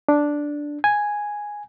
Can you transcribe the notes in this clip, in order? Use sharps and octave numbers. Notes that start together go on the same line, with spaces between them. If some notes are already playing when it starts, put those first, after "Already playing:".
D4
G#5